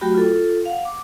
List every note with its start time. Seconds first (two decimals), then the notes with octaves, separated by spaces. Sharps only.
0.01 F#3 A3 F#4 G4 G5 B5
0.15 F4 A4
0.65 F5 F#5
0.85 D6